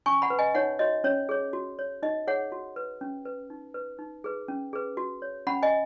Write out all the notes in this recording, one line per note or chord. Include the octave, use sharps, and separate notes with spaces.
C#4 G#5 C#6
F#5 B5
B4
D#5 G#5
D#4 C#5 F#5
F#4 C#5 D#5
C#4 C#5
G#4 C#5
F#4
C#5
D#4 D#5
G#4 C#5 F#5
F#4
B4
C#4
B4
D#4
B4
D#4
G#4 B4
C#4
G#4 B4
F#4
C#5
C#4 F#5 B5
D#5 G#5